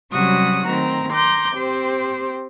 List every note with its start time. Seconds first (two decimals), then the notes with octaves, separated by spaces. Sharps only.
0.12 C3 F#3 G3 C#4 F#4 D#6
0.67 D#3 A3 C4 A#5
1.11 A#5 C6 D6 G6
1.55 C4 G4 C5